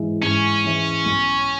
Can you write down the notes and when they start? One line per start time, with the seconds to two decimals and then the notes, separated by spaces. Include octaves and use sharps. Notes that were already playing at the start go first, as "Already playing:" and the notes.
Already playing: G#2 E3 G#3 E4
0.23 G#2 C#4
0.64 E3 G#3 E4
1.05 B1